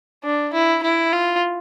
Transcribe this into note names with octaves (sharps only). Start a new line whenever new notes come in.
D4
E4
E4
F4